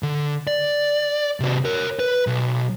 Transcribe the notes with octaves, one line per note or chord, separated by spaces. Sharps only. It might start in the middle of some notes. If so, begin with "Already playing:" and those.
D3
D5
C3 F#4
A#4 C#5
B4
B1